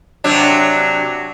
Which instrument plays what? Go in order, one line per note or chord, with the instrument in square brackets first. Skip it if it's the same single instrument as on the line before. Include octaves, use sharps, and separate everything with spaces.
[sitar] C3 F#3 D4